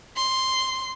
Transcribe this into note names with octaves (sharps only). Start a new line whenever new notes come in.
C6